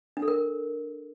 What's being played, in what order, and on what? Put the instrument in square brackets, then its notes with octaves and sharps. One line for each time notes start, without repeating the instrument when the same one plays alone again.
[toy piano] D4
A4
A#4